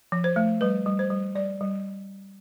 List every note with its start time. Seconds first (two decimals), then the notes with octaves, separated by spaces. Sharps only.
0.12 F3
0.24 C5
0.36 A3
0.61 G3 B4
0.86 G3
0.99 C5
1.10 G3
1.35 G3 D5
1.61 G3